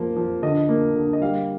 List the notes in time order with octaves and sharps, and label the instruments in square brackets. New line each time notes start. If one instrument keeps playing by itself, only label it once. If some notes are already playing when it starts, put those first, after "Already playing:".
Already playing: [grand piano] F3 A#3
F3
D3 D#5
A#3
D3
D#5
G3 F5